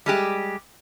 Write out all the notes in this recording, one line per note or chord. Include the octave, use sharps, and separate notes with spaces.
G3 G#3 G4